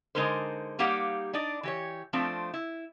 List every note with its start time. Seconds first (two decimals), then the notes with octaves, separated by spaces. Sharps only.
0.15 D3 G#3 D#4 E4 A#4 C5
0.79 G3 A#3 D#4 G4 F5 F#5
1.33 D4 D#4 D5
1.63 E3 G4 C#5
2.13 F3 A3 C4 D4 F4
2.54 E4